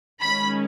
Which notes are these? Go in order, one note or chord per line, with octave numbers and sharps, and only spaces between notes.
D#3 G#3 C#4 B5